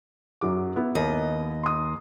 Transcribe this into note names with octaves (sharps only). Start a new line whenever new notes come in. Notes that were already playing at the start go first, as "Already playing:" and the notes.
F#2 F#3 D6
B3 E4
D#2 D#5
C6 D#6